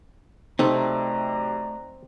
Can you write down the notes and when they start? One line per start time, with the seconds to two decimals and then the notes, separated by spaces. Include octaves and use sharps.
0.59 C3 F#3 A3 C4 D#4 D5 A#5